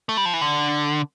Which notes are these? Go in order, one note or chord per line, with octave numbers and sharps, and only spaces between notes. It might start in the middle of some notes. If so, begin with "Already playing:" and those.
A3
G3
F3
E3
D3